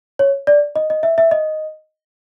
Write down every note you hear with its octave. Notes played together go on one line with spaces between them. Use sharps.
C#5
D5
D#5
D#5
E5
E5
D#5